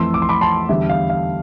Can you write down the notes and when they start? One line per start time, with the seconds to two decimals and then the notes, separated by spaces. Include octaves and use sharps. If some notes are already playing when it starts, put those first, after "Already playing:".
Already playing: F2 E3 A3 C6 E6
0.14 D6
0.22 C6
0.29 B5 D6
0.41 A5 C6
0.69 E2 D3 G3 E5
0.89 F5
1.10 F5